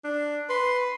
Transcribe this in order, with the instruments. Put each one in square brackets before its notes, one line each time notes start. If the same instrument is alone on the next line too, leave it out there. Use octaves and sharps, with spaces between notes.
[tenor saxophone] D4
[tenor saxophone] B4 [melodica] C6